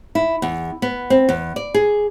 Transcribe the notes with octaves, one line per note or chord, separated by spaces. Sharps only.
E4
E2
B3
C4
E2
D5
G#4